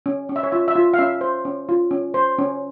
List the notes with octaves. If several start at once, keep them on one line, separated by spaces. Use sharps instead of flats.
C#4
C#4
E5
C#5
F4 E5
E5
F4
F5
C#4 E5
C5
C#4
F4
C#4
C5
C#4